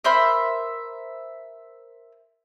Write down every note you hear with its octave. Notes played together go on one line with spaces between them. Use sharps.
A#4 C5 E5 B5